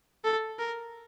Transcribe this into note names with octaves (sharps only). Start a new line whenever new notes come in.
A4
A#4